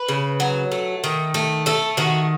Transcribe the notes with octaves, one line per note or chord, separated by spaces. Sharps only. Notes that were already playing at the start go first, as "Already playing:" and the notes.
Already playing: B4
C#3
F#3
A3
D#3
A3
A3 A4
D#3 F#4